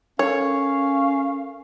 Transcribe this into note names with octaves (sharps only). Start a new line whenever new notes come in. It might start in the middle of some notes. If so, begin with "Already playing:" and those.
C#4 A4 A#4 C#5 F5